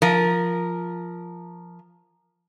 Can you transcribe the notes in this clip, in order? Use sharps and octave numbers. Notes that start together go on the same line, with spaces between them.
F3 A#4